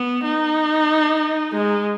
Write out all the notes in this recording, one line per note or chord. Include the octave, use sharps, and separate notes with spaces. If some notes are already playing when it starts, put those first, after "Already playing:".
Already playing: B3
D#4
G#3